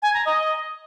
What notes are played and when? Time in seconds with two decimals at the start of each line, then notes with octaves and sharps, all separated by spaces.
0.02 G#5
0.14 A#5
0.25 D#5